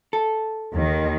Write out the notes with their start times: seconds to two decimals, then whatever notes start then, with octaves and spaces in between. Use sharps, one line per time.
0.13 A4
0.74 D#2 D#3